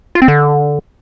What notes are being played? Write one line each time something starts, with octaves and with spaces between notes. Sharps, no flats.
F4
C4
D3